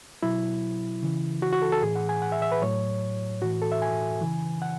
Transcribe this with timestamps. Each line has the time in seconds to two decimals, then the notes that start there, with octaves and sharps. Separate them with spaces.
0.23 B2 F#3 E4
1.03 C#3 E3
1.42 F#4
1.52 F#4
1.62 A4
1.72 A4
1.82 A2 E3 G#4
1.95 F#5
2.09 G#5
2.22 F#5
2.32 E5
2.42 E5
2.52 B4
2.62 A2 F#3 C#5
3.42 A2 E3 F#4
3.62 A4
3.72 E5
3.82 G#5
4.21 C#3 E3
4.62 F#5